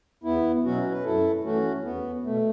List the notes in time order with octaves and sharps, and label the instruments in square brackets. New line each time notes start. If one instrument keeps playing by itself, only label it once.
[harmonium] E2 B3 E4
B2 F#3 C#4 F#4
B4
F#2 E4 A4
E3 A3 C#4 F#4
E2 B3
B2 A3